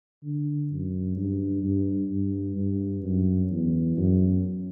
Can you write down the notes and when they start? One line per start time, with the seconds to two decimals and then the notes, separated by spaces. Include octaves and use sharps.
0.23 D3
0.70 F#2
1.16 G2
1.63 G2
2.11 G2
2.56 G2
3.03 F#2
3.51 E2
3.97 F#2